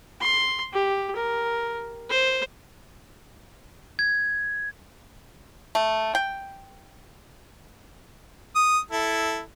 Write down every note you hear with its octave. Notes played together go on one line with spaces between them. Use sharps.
C6
G4
A#4
C5
G#6
A3
G5
D#6
E4 A4